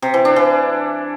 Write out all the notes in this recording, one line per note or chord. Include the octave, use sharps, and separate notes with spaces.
C3
E3
D4
E3